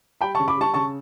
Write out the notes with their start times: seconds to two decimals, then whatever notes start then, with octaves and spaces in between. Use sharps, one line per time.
0.21 G3 G5 B5
0.35 C#3 A5 C#6
0.48 B5 D6
0.57 G3 A5 C#6
0.74 C#3 A5 C#6